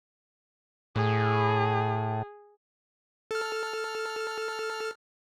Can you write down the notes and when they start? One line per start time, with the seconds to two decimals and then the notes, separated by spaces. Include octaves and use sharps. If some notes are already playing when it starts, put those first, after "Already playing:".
0.96 A2 G#4
3.31 A4 F6